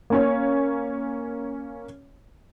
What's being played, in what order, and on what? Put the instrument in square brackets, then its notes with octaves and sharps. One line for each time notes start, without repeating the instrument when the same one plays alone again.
[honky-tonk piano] A#3 C#4 C#5